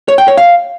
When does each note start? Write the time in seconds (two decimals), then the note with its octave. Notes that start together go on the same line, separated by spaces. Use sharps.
0.08 C#5
0.18 G5
0.28 C#5
0.37 F5